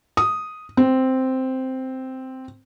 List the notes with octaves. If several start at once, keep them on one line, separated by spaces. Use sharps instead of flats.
D#6
C4